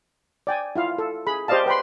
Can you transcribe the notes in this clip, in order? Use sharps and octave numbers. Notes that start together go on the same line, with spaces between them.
D5 G5 G#5
E4 F4 F5
A4
G#4 B5
G4 C5 D5 D#5 F5 A5
B4 G5 B5 C6